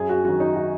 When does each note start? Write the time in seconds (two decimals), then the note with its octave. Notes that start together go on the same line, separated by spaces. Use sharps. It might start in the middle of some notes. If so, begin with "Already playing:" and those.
Already playing: F#2 G#4
0.09 F#4
0.24 D#3 F#3 F#4
0.40 D#4
0.56 F#4